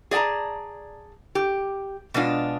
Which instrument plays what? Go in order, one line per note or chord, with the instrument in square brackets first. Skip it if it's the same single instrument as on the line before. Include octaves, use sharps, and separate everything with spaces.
[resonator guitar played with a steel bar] G#4 D5 G5 A5 A#5
G4
B2 G#3 D4 F4